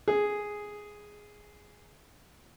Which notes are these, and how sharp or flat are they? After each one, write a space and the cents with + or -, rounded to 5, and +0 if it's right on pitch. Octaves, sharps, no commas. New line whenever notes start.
G#4 +0